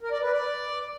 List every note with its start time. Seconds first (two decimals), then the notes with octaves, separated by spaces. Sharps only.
0.01 A#4
0.11 D5
0.22 B4
0.32 D5